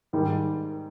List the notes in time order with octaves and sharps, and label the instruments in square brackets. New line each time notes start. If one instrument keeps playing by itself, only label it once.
[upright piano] G#2 D#3 G3